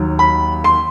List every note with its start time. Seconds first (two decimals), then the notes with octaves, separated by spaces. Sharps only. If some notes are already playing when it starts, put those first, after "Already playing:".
Already playing: D#2 D#3 F#3
0.19 B5
0.64 C6